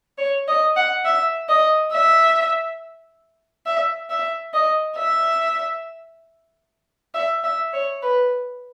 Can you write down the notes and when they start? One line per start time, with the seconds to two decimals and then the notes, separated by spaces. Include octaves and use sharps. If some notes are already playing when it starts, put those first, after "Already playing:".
0.18 C#5
0.48 D#5
0.76 F#5
1.05 E5
1.49 D#5
1.92 E5
3.66 E5
4.10 E5
4.54 D#5
4.97 E5
7.15 E5
7.44 E5
7.73 C#5
8.02 B4